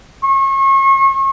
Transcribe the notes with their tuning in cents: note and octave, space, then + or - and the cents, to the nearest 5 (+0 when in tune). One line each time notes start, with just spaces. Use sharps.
C#6 -35